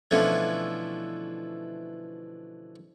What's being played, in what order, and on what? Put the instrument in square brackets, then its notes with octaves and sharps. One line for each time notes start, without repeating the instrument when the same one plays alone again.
[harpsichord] B2 D3 E3 F3 A3 C#4